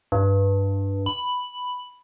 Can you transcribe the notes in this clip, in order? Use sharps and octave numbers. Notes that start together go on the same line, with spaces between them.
G2
B5